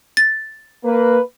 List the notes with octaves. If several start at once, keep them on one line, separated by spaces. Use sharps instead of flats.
A6
A#3 B4